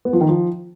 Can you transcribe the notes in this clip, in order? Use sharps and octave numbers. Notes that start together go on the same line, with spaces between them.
B3
F3
D#3
F3